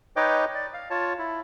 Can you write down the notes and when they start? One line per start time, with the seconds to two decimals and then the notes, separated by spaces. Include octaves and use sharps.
0.16 D#4 B4 C#5 D#5 G5 D6
0.54 D5
0.74 F5
0.90 F4 C#5 A5
1.19 E4